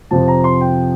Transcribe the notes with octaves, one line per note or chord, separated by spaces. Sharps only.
F2 C3 F3 A5
A#5
C6
G5